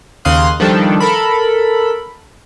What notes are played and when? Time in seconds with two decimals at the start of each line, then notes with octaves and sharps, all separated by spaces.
0.25 D#2 C#3 F5 C6 D#6 F#6
0.60 D#3 F3 G3 D4 A4
1.00 A4 A#4 B5